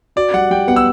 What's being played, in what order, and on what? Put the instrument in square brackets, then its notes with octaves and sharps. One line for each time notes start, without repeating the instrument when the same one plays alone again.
[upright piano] F#4 [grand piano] D5
[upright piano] G3 [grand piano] F#5
[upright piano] G3 [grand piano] G5
[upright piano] B3 [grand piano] F#5
[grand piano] E6